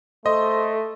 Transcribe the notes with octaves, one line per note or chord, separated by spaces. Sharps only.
A3 A4 C5 D#5